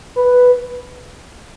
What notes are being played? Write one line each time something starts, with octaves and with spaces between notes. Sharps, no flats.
B4